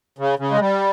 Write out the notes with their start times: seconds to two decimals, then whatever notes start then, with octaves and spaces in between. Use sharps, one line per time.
0.18 C#3
0.39 C#3
0.51 G#3
0.60 G3